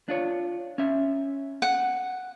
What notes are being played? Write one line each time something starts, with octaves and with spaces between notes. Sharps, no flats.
D4 F4 C#5
C#4 E5
F#5